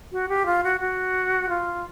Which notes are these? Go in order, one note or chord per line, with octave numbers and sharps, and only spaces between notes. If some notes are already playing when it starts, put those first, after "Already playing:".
F#4
G4
F4
F#4
F#4
F4